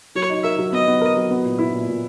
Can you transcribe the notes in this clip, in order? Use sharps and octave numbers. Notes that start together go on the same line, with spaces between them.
F#3 C#5
D#4
A#4 E5
F#3
B3 D#5
B3
A#4
F#3
B3
A#2
E4
A#2
A#2